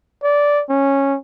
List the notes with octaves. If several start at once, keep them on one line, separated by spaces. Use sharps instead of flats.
D5
C#4